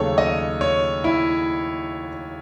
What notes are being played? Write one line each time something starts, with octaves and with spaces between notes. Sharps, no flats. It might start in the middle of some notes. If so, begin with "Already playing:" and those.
Already playing: D#2 C#3 F#3 A3 A4 C#5
D#5
C#5
E4